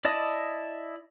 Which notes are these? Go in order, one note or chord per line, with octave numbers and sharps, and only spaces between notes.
E4 D5 D#5 A5 D#6